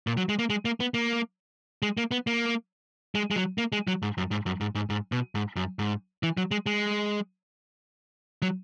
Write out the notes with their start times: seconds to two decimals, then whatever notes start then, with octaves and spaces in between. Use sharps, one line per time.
0.07 A#2
0.17 F#3
0.29 G#3
0.39 A#3
0.50 G#3
0.65 A#3
0.80 B3
0.94 A#3
1.82 G#3
1.97 A#3
2.11 B3
2.27 A#3
3.15 G#3
3.31 G#3
3.36 F#3
3.58 A#3
3.72 G#3
3.87 F#3
4.03 G#2
4.18 F#2
4.31 G#2
4.46 F#2
4.61 G#2
4.75 G#2
4.90 G#2
5.12 B2
5.35 G#2
5.56 F#2
5.79 G#2
6.23 E3
6.37 F#3
6.51 G#3
6.66 G#3
8.42 F#3